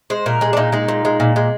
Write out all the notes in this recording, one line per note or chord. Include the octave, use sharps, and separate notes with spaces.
G#3 C5
A#2 A#4
G#3 G#4
D4
A#2 D#4
G#3 D#4
A#2
G#3
A#2
G#3